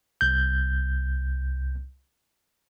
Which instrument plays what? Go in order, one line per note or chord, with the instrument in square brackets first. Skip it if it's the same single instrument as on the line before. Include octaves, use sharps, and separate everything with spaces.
[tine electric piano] C2 G6